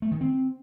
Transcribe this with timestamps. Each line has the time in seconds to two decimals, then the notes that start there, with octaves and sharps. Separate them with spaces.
0.02 A3
0.12 D#3
0.21 C4